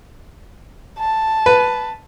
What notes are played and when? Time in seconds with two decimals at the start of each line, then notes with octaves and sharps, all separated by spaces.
0.99 A5
1.46 B4